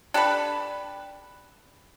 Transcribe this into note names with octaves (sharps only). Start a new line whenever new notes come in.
D4 G4 A4 B4